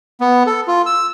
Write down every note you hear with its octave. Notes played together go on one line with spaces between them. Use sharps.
B3
A4
F4
E6